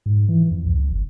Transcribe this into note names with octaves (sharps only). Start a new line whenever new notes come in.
G#2
E3
F2
C#2
G1